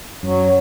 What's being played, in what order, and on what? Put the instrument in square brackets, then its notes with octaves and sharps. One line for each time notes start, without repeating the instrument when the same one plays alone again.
[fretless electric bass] F#2 [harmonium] F#3